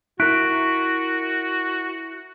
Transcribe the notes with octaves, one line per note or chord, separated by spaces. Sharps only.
E4 F#4 A#4 C#6 F#6 B6 D7